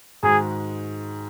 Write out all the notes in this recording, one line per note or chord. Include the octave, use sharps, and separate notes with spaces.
G#2 D#3 G#3 F#4 G#4